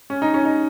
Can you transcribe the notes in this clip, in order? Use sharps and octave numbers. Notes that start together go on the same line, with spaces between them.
C#4
D#4
C#4
D#4